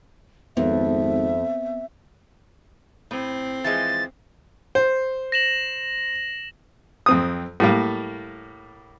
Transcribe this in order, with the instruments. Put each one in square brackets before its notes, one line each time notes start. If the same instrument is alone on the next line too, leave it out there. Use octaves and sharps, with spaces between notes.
[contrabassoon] G#1 [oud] F2 [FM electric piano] B3 [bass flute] E5
[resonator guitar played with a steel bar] A2 [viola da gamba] C4
[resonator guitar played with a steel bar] E3 F3 G#3 [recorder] A6
[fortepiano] C5
[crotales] A#6 E7 F#7
[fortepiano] F2 C4 D#6
A2 G3 A#3